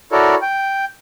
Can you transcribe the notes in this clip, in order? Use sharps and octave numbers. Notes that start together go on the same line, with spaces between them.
E4 F#4 A4 A#4 C#5 D5
G5